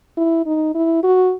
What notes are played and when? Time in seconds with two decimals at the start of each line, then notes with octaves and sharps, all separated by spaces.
0.18 E4
0.46 D#4
0.75 E4
1.04 F#4